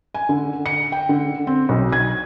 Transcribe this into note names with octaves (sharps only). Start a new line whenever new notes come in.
G#5
D3
C#7
G5
D3
C4
B1
G#6